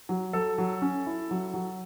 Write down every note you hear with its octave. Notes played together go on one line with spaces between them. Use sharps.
F#3
F#3 A4
F#3
C#4
E4
F#3
F#3